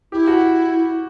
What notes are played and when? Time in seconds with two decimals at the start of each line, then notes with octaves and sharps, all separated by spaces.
0.12 E4 G4
0.27 F#4